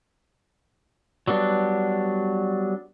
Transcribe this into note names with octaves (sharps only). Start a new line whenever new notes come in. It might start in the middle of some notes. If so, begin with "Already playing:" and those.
F#3 G3 B3 D4